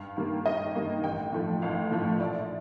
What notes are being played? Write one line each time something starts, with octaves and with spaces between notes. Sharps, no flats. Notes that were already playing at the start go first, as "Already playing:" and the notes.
Already playing: G2 F5
D#3 G3 A#3
G2 D#5
D#3 G3 A#3
A1 G5
A2 F3 A3
A1 F5
A2 F3 A3
A#1 D5